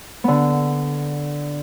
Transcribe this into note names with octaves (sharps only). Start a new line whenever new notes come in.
D3 B3